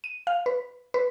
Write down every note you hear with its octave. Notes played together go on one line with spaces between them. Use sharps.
D#7
F5
B4
B4